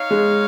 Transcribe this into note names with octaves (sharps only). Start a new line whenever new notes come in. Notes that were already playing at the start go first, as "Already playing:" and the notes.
Already playing: D#4 C#5 F5
G#3